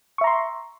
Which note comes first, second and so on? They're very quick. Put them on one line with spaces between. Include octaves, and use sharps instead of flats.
C#6 E5 A#5 C6